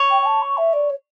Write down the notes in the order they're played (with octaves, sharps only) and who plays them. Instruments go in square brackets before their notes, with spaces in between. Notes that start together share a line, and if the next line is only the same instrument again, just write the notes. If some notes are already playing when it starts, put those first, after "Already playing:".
Already playing: [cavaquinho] C#5
[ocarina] G5
G5
A5
C#6
E5
D5
C#5